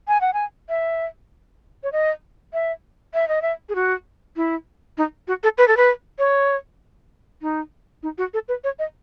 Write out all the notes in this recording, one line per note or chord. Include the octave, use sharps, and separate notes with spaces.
G#5
F#5
G#5
E5
C#5
D#5
E5
E5
D#5
E5
G#4
F#4
E4
D#4
F#4
A4
B4
A4
B4
C#5
D#4
D#4
F#4
A4
B4
C#5
D#5